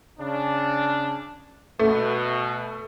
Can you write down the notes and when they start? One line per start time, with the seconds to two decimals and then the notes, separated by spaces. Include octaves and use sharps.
0.19 C#3 D4
1.79 B2 A3